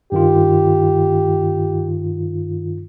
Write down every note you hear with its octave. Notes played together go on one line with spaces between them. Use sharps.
G2 D#3 F4 G4